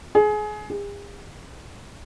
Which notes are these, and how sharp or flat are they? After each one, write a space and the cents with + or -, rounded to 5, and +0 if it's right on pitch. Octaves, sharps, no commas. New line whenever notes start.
G#4 +25
G#4 -45